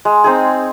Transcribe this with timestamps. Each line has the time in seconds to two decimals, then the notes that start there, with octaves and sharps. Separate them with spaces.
0.05 G#3
0.24 C4 D#4 G#4